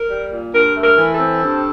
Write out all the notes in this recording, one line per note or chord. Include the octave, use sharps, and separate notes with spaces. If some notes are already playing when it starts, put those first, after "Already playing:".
Already playing: A#4
G3
A#2
G2 A#4
A3
A#4
E3
A4
C4
G2